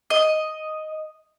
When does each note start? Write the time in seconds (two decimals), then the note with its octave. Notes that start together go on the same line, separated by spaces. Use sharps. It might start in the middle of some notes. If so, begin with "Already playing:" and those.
0.10 D#5